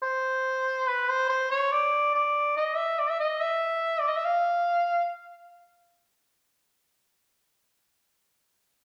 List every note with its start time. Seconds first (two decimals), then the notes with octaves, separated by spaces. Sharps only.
0.03 C5
0.87 B4
1.09 C5
1.29 C5
1.51 C#5
1.72 D5
2.14 D5
2.57 D#5
2.77 E5
2.99 D5
3.10 E5
3.20 D#5
3.41 E5
4.00 D5
4.08 D#5
4.17 E5
4.25 F5